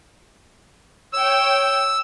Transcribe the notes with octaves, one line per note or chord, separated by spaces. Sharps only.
C#5 G5 E6